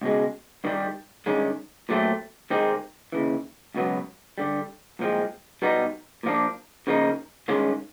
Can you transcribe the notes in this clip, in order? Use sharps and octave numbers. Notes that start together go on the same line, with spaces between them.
C#2 B2 G#3
G2 D#3 G3
G2 D#3 G#3 C#4
A#2 F#3 A3 C4
C3 D#3 G#3 C4 D#4
D#2 C#3 E3
C#2 B2 F#3 B3
G2 D3 G3
C2 A#2 F3 G#3 C4
B2 G3 B3 D#4
A#2 F3 A#3 D4
C#3 F3 A#3 D#4
G2 D#3 G#3 C#4 F4